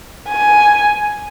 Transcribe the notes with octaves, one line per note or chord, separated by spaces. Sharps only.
G#5